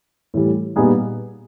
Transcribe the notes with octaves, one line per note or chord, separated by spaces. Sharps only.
A2 E3 G3
A#2 G3 B3 D#4 G#4